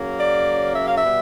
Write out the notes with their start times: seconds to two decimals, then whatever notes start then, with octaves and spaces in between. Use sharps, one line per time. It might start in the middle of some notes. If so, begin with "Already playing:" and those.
Already playing: C#3 F#3 A#3 C#4
0.18 D5
0.75 E5
0.86 F5
0.97 E5
1.05 B2 G3 B3